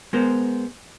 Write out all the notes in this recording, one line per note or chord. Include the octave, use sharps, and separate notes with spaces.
G#3 B3 A#4 C5